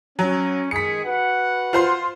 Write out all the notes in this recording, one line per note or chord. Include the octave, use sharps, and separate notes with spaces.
F#3 C#4
D#3 G#3 G#4 B6 C#7
F#4 B4 F#5
F4 C5 C6